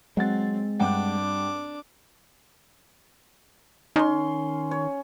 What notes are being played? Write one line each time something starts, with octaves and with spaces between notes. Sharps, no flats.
F#3 G#3 C4 F#5 A6
G2 D4 F#5 G5 D6
D#3 C#4 C6
C#5